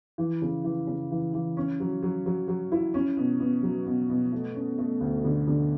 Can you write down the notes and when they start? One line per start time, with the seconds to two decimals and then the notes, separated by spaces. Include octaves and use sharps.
0.18 E3
0.42 C#3
0.64 E3
0.87 C#3
1.11 E3
1.34 E3
1.57 C#4
1.80 F#3
2.02 F#3
2.26 F#3
2.48 F#3
2.72 E4
2.94 C#4
3.17 B2
3.40 B2
3.63 F#3
3.86 B2
4.09 B2
4.32 A3
4.55 C#4
4.78 A3
5.01 D2
5.24 D3
5.47 D3